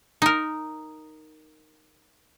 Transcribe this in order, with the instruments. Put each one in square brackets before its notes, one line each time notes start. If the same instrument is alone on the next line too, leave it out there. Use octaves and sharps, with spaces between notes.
[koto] D#4 A#4